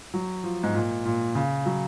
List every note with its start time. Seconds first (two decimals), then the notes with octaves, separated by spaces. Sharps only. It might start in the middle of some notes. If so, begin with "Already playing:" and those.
0.14 F#3
0.44 F3
0.63 G#2
0.74 A#2
1.05 A#2
1.35 C#3
1.66 F#3